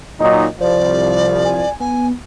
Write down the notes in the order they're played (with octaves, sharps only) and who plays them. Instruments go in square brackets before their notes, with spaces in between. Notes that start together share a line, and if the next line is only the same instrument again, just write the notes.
[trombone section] A#2 F#3 D#4 [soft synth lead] D#5
[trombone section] C2 F3 [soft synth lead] C5 [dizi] D5
[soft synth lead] G#5
[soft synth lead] B3 [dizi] G#5